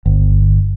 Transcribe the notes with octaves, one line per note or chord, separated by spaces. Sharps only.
G1